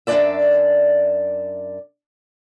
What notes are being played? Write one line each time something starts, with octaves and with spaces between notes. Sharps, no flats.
F#2 F3 D4 D5 E5